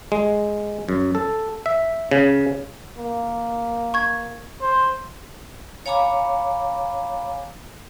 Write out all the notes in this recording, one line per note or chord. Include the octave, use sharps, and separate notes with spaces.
G#3
F#2
A4
E5
C#3
A#3
C#6 G#6
C5
C#5 F5 G#5 A#5 B5 D6